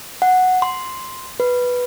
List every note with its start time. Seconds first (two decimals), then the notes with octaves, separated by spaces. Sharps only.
0.22 F#5
0.62 C6
1.40 B4